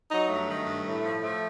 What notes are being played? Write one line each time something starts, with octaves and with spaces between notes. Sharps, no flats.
F#3 D#4
G2 A3
D#3
G2
A2
F3
F3 A3